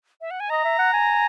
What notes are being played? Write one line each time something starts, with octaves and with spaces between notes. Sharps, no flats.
E5
F#5
G#5
D#5 A#5
E5
F#5
G#5